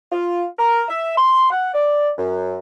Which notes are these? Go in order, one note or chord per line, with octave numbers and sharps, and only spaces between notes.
F4
A#4
E5
C6
F#5
D5
F#2